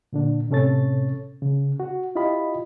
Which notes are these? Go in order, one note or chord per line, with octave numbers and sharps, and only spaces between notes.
A#2 D3 D4
A2 C3 C#4 A4 C#5 A6
C#3
F#4
E4 F4 G4 D#5 B5